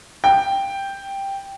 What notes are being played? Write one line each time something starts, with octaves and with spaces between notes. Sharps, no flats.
G5